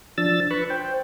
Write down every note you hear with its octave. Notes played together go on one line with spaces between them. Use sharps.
F3 D4 E6 A6
B4 B5 C#6
C5 G5